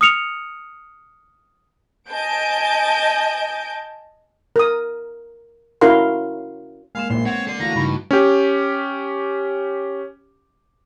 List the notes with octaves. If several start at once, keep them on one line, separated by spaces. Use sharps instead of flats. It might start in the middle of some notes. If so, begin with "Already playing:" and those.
D#6 F6 C#7 F7
D#5 G#5 A5 G6 D7
A#4 D#6
C#4 E4 F#4 A#4 F5 C6
G#3 A#3 F5 G#5 C6 E7
A#1 A#2 B3 E5 C6
C4 C#5 F#5
A4 D5 C6
E3 A3 F#4 F5 A#5
G2 C#3 D#4 B5
C#4 G4